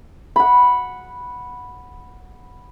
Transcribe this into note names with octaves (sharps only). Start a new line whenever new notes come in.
F#5 B5